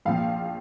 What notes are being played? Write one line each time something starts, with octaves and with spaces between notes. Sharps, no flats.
A#1 A#2 F3 F5